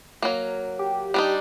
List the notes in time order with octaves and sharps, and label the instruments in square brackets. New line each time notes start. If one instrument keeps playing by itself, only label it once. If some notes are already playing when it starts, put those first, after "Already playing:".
[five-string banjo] F#3 A#3
[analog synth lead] G4
[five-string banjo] G3 D4 D#4